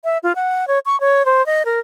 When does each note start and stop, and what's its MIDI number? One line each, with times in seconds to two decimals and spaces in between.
0.04 0.18 76
0.23 0.33 65
0.35 0.68 78
0.68 0.79 73
0.86 0.99 85
1.01 1.25 73
1.26 1.45 72
1.46 1.63 75
1.65 1.80 70